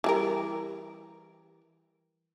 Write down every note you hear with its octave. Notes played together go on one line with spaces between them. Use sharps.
E3 G3 A#4